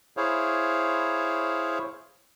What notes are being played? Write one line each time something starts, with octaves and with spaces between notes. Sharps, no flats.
E4 G#4 C5 C#5 F5